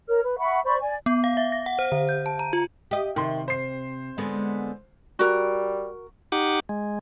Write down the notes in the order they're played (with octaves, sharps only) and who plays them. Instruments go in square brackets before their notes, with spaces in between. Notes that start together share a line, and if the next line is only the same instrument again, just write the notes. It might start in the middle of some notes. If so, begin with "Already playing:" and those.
[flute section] A#4 C#5 F6
B4
E5 F#5 B5 C#6
C5 D5 B5 C#6
D5 G#5
[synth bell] B3
F5
E5
A#6
F#5
C5
D3
G6
A5
A#5
F4
[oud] G4 D#5
[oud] C3 [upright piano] D#3 C6
[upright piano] C5 C7
[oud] D3 G#3 B3
[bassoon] G3 [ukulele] F#4 A#4
[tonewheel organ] D#4 G4 F#5 D6
G#3